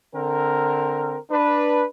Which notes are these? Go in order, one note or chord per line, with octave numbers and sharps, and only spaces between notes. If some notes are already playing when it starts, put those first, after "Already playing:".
D3 C4 A#4
D4 B4